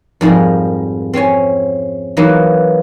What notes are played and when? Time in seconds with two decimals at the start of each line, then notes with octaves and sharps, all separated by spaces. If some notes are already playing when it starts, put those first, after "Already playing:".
0.21 F2 G#2 G3 G#4 A#4
1.13 C4 C#4 C#5 G#5
2.17 E3 F#3 A#3 B3 D#4